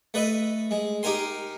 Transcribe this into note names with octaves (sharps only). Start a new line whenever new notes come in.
A3 B4 D#5 E5
G#3
D#4 G4 A#4 G#5 C6